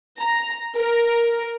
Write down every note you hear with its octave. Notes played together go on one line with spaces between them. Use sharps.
A#5
A#4